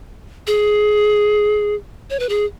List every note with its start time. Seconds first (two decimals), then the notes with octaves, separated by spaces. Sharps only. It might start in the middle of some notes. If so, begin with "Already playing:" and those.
0.47 G#4
2.10 C#5
2.19 B4
2.29 G#4